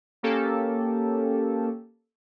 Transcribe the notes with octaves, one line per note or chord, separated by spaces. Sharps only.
A#3 C#4 G4 A4